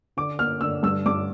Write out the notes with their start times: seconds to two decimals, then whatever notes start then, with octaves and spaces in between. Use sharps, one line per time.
0.17 D3 D6
0.39 A#3 F6
0.61 D3 E6
0.83 G2 E6
1.06 G2 D6